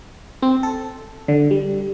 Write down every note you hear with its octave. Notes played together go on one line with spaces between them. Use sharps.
C4
A4
D3
G3